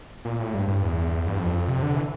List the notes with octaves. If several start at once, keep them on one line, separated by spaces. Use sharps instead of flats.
A#2
A2
G2
G2
E2
G2
F2
C3
D3
E3